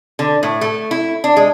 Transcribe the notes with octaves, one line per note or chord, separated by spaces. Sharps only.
D3
A2
A3
E4
D4
G#3